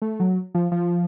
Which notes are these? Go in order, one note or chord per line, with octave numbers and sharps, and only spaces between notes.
A3
F#3
F3
F3